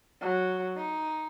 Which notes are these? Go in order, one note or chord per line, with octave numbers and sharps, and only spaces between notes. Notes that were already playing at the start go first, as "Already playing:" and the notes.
F#3
D#4